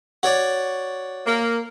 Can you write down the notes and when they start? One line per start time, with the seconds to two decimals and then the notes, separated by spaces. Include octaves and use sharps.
0.23 F#4 C#5 D5
1.26 A#3